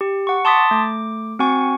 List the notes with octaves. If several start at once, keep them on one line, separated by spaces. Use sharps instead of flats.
G4
F#5 C#6
A5 C6 D6 D#6 A6 B6
A3 D6
C4 F#4 F#5 G#5 C#6